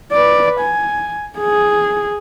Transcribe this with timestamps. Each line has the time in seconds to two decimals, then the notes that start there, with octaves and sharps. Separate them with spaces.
0.12 B4 D5
0.60 G#5
1.39 G#4